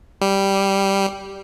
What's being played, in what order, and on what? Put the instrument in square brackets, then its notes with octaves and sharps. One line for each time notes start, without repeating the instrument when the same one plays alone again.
[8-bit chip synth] G3